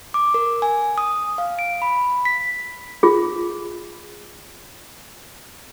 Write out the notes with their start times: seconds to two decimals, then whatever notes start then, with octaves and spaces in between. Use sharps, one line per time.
0.14 D6
0.34 A#4
0.62 G#5
0.98 D#6
1.38 F5
1.59 D7
1.82 B5
2.25 B6
3.03 F4 G#4